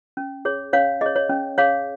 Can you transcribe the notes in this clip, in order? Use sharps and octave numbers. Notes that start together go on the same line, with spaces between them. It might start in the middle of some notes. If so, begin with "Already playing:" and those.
C#4
G#4 C#5
C#4 C#5 F5
G#4 C#5 D#5
C#5
C#4
G#4 C#5 F5